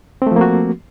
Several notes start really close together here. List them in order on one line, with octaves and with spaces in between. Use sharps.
C4 A3 F3 A#3 F#4